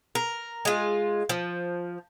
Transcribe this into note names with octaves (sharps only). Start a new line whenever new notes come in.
A#4
G#3 F4
F3